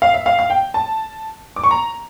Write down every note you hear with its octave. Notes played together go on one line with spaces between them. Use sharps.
F5
E5
F5
F5
G5
A5
D6
C#6
A#5